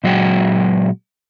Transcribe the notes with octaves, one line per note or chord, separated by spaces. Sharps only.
A#2 F#3 G#3 F#4 G5